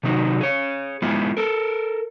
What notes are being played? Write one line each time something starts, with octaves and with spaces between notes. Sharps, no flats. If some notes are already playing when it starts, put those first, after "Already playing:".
C3 D#3 F#3 D#4
G#4 C#5
G#3 B3 E4 F4
A4 A#4